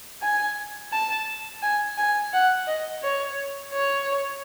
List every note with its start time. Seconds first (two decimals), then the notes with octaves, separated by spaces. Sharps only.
0.22 G#5
0.93 A5
1.63 G#5
1.98 G#5
2.33 F#5
2.68 D#5
3.03 C#5
3.73 C#5